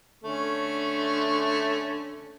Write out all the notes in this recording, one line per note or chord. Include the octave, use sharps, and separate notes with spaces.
D3 A3 C#4